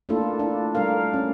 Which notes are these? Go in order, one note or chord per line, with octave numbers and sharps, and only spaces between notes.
A3 A#3 D4 E4 F4 A4
D4 E4
G3 A3 D4 A#4 F5
C#4